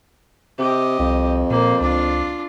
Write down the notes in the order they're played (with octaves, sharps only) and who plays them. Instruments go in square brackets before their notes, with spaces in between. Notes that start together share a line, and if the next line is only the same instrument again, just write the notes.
[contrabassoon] C3 [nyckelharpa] G4 D#5
[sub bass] C2 [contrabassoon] F2
[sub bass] A#2 [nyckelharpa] A#3 C5
[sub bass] C#2 [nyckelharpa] D4 F4